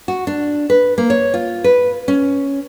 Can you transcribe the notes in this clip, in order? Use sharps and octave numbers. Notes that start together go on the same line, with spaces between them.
F#4
D4
B4
A#3
C#5
F4
B4
C#4